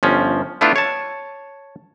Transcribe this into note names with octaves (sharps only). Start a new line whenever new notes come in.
G1 F3 C#4
A3 B3 D4 E4 F4
C#5 A5